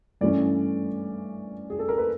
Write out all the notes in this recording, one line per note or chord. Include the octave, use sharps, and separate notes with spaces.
G2 E3 A3 C#4 D5
G#4
A4
A#4
B4